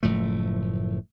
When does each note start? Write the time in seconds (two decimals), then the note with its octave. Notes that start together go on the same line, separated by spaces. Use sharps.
0.03 F#1 A2 F3 A3